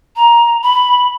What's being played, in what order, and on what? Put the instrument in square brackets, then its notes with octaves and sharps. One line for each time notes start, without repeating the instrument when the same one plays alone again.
[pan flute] A#5
B5